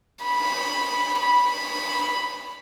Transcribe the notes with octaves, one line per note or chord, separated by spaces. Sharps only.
B5
B5